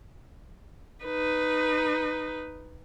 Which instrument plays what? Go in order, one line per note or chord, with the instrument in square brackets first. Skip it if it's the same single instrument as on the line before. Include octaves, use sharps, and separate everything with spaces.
[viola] D#4 B4